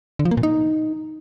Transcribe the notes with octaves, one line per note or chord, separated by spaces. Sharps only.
D3
F3
A#3
A#2
D#4